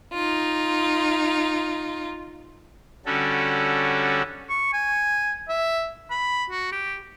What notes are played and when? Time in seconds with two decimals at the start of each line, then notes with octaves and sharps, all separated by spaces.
0.12 D#4 F4
3.06 D3 G3 C#4 F#4 A4
4.49 C#6
4.73 G#5
5.49 E5
6.11 B5
6.50 F#4
6.72 G4